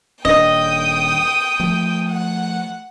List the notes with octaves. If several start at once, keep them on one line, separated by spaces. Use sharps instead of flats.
D#1 D4 D#5 G5 D#6
F3 A3
F#5